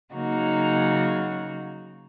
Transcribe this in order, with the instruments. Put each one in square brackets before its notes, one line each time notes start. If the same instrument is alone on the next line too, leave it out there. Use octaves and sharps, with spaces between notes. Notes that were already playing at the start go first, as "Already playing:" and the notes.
[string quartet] C#3 F#3 A#3 D#4 F#4